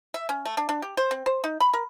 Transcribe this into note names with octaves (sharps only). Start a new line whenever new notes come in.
E5
C#4
A3
D4
D4
G4
C5
C4
C5
D#4
B5
A#4